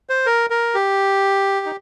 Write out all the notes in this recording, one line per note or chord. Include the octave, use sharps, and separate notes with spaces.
C5
A#4
A#4
G4
D#4